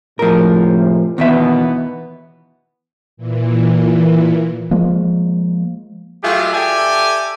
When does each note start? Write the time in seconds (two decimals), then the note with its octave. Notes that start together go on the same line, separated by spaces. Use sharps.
0.19 A2 C3 F3 G#3 A#4
1.18 D#2 B2 E3 B3 E5
3.17 A#2 E3
4.71 F3 G#3 A#3
6.23 F#3 G#3 A3 F4 G4 G#4
6.53 G4 A4 D5 E5 G5 G#5